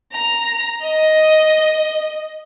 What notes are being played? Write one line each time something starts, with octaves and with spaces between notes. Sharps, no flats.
A#5
D#5